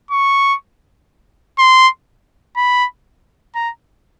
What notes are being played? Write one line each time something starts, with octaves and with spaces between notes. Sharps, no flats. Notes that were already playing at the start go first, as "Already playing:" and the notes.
C#6
C6
B5
A#5